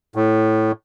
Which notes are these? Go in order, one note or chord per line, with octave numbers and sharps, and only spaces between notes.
A2